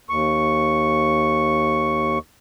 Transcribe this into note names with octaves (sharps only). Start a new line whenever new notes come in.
D#2 C#6